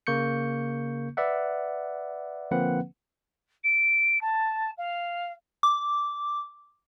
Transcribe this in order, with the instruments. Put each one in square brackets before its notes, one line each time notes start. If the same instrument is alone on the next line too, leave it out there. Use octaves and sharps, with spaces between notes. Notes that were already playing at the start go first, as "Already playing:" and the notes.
[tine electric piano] C#3 A#3 C#6 G6 C#7
B4 D5 E5 F#5
D3 F3 A#3 C4 B4 F#5
[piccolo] D7
A5
F5
[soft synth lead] D6